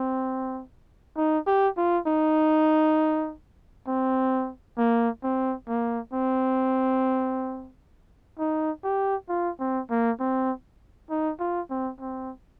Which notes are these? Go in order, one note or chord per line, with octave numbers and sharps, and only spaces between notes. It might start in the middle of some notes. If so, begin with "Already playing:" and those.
Already playing: C4
D#4
G4
F4
D#4
C4
A#3
C4
A#3
C4
D#4
G4
F4
C4
A#3
C4
D#4
F4
C4
C4